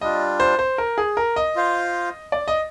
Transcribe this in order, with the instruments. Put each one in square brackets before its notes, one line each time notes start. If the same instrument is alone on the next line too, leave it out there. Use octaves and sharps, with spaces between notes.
[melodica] G3 D4 F4 [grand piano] D#5
[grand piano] C5
C5
A#4
G#4
A#4
D#5
[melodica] F4 C5 F5
[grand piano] D5
D#5